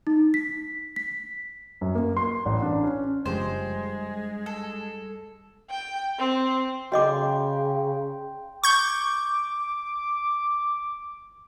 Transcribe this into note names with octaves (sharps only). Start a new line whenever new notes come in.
D#4
B6
B6
F#2
A#3
C6
A1
D4
C#4
F#1 G2 F3 G3 G#3 C5
A4
G5
C4
C#3 F#4 D#5 G5 C6 D6
C#6 D6 G6